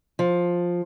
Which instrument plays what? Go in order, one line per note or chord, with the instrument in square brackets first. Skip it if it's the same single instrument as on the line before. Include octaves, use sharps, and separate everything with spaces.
[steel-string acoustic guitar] F3